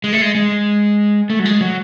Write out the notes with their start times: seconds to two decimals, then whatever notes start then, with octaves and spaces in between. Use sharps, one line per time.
0.04 G#3
0.13 A3
0.21 G#3
0.35 G#3
1.30 A3
1.39 F#3
1.45 G#3
1.61 F#3